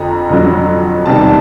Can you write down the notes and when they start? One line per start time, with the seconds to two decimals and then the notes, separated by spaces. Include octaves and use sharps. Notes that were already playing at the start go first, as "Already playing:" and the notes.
Already playing: F2 D3 A#5
0.29 F2 D3 F#3
1.06 E2 C3 D#3 G3 A5